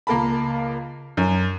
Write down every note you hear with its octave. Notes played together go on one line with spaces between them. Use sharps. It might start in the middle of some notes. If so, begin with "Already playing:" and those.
C#2 A#3 A#4 A5 B5
F#2